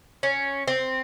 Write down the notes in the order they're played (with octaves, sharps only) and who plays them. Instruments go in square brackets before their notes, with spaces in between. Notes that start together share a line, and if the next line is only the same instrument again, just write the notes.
[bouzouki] C#4
C4